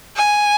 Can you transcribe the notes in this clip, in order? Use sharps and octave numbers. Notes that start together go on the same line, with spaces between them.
G#5